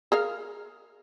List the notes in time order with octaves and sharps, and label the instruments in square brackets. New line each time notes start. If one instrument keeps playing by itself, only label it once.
[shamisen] G#4 A#4 F5